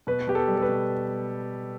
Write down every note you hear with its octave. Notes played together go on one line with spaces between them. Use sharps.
B2 B4
B2 G4
A4
G3
A4
B4
B2